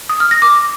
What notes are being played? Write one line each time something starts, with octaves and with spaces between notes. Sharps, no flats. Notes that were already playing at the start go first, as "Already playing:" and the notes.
D#6
F6
A#6
D6